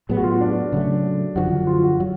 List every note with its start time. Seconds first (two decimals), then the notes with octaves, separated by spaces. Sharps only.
0.09 A2 F#3 B3 G#4
0.17 F#4
0.24 F4
0.32 F#4
0.41 D4
0.72 C#3 F#3 A3
1.36 F#2 D3 F3 F#4
1.67 F4
1.83 F#4
2.00 F#3